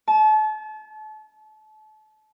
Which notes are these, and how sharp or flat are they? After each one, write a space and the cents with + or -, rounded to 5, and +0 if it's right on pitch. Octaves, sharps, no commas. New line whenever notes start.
A5 -35